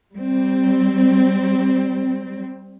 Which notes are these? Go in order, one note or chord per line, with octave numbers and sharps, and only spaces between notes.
G3 C4